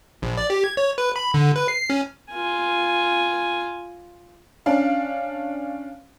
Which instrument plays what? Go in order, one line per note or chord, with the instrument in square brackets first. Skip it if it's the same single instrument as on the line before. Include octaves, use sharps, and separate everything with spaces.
[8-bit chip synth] A#1
D5
G4
G#6
C#5
B4
B5
D3
B4
C7
C#4
[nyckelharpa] F4 G#5
[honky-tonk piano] C#4 D4 F5